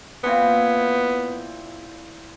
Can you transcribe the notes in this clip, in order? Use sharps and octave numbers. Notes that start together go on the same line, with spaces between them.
A#2 B3 C4 E4